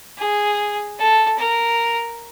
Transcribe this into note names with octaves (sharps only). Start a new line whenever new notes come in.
G#4
A4
A#4